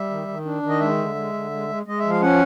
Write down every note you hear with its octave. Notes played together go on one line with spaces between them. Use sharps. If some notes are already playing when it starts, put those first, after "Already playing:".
Already playing: G3 E5
D#3
D#3
D4
D#3
D#5
G#3 E5
D3
G#3
D3
G#3
G#3
G#3 D#5
F3 E5
F5
C#4 F#5